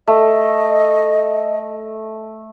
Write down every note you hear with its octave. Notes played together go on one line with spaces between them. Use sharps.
A3 D#5